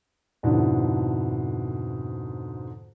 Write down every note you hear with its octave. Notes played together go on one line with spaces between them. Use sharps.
F2 G#2 B2 D3 D4 E4